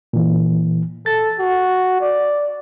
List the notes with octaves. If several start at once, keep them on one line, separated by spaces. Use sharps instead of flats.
A#2 E3
A4 A6
F#4
D5